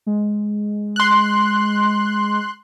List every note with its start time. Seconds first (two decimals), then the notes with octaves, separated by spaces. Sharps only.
0.06 G#3
0.96 C6 F#6